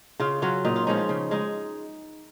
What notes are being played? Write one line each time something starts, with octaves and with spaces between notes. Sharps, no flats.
C#3 F4
F#3 C#4 F4
A#2 D#4
F4
F3 G#3 C#4 D#4
F4
C#3
G#3 D#4